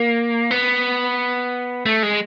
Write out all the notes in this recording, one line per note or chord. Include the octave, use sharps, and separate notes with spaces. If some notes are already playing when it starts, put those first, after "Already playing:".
Already playing: A#3
B3
A3
G#3